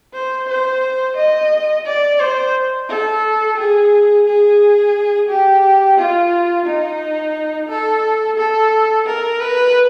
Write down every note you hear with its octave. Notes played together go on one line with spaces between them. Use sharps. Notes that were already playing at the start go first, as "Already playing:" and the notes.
C5
C5
D#5
D5
C5
A4
G#4
G#4
G4
F4
D#4
A4
A4
A#4
B4